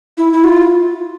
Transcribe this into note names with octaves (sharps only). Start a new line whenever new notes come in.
E4
E4
F#4
F4